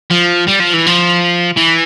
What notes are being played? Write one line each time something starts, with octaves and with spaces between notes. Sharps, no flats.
F3
G3
F3
E3
F3
E3